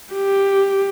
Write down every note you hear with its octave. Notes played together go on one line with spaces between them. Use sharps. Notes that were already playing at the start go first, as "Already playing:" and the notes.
G4